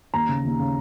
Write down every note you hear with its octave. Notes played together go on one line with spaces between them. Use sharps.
D#2 A#5
C#3
D#2
C#3